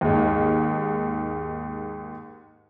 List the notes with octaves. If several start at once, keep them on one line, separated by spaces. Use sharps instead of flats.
D#2 G#2